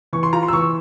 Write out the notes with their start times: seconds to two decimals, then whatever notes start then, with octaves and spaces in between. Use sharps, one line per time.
0.13 E3 C#6
0.23 C6
0.33 F4 A#5
0.43 C6
0.48 E6
0.53 E3 C#6